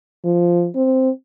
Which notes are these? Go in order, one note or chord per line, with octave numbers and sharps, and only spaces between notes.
F3
C4